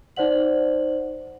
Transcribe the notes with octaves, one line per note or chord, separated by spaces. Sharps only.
D#4 C5 D5 F#5 F#7